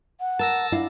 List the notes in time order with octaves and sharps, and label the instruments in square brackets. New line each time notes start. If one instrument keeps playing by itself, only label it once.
[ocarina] F#5
[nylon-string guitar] A#4 [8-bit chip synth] A5 E6 A#6
[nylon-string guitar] D4 E4 F5